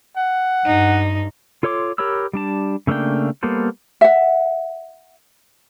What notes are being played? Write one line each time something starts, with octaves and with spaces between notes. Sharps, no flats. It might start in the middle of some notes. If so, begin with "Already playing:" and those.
F#5
G2 D#4
F4 A4 C#5 C6 D6
G4 A#4 C#5 B5 E6
G3 D4 A5
C#3 A3 A#3 D4 G5
G3 A#3 B3 A4 C5
E5 F#5